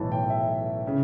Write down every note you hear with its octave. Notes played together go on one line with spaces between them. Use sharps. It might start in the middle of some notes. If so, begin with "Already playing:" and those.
Already playing: B1 A2 E3 A5 B5
G5
E5
C#3